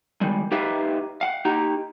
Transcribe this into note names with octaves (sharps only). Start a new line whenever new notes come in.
D#3 G3 G#3
D#4 G4 B4 E5 F5
F5 F#5
D#4 G4 A#5